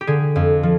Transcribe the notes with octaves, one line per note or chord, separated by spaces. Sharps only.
G4
D3 G#4
F2
F3